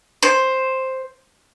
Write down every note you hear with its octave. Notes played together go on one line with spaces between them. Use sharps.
C5